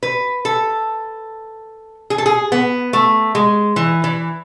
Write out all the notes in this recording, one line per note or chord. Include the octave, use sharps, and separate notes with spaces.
B4
A4
G#4
A4
G#4
B3
A3
G#3
E3
E3